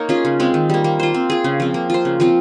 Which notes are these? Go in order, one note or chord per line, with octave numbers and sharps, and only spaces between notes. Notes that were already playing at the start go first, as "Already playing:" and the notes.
Already playing: A#3 D#4 A#4 C#5
C#4 F4 G#4
C#3
G#3 C4
D#3
G3 A#3
A#3
F4 C5
C4
F4 G#4
C#3
F3 C4
A#3
F4 C5
C#3
F3 C4 F4